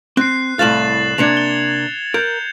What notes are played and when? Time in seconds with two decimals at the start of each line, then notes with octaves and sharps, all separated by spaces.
0.17 C4 F#6 C7
0.59 C2 A2 F5 A6 E7 F#7
1.18 C3 A#3 D4 G#6 C#7 F7
1.37 G7
2.14 A#4 G6